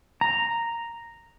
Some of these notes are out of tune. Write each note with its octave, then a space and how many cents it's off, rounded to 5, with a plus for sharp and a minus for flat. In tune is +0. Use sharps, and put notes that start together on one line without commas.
A#5 -5